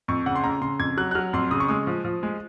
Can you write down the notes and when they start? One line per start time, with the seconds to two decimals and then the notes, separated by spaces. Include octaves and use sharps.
0.08 F2 C#6
0.26 C#3 F#5
0.36 C6
0.44 C#3 A#5
0.61 C#3 C6
0.79 F2 G#6
0.97 F#3 F#6
1.11 F#6
1.15 F#3 F6
1.33 F2 C6
1.51 C#3 D#6
1.60 C#6
1.68 G#3 D#6
1.87 F3
2.05 F3
2.23 G#3